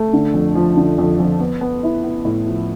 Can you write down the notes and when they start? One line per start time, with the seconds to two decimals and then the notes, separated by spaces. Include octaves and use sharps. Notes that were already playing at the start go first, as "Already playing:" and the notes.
Already playing: A3
0.13 D3
0.34 F2
0.55 F3
0.77 D3
0.98 F2
1.19 F2
1.40 B3
1.61 B3
1.83 E4
2.04 B3
2.25 A2
2.46 F3